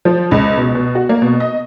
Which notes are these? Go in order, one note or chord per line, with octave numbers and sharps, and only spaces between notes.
F3
C#2
B2
B2
F#4
A#3
B2
D#5